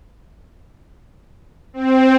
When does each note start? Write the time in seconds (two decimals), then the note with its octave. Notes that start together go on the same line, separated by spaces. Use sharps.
1.74 C4